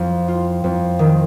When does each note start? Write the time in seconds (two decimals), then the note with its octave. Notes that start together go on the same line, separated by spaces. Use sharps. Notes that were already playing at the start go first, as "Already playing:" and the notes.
Already playing: F2
0.28 F4
0.64 F2
0.99 D#3